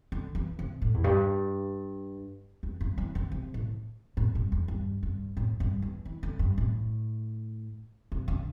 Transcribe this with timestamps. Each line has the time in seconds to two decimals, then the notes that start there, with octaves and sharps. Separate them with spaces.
0.12 D3
0.35 E3
0.59 C3
0.82 A2
0.94 E2
1.04 G2
2.63 E2
2.81 G2
2.98 E3
3.15 D3
3.32 C3
3.54 A2
4.17 A2
4.35 G2
4.52 E2
4.68 G2
5.03 G2
5.37 A2
5.60 G2
5.82 E2
6.05 E3
6.23 D3
6.39 G2
6.58 A2
8.12 C3
8.28 D3